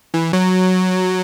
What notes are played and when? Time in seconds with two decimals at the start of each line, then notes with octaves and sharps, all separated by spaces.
0.14 E3
0.33 F#3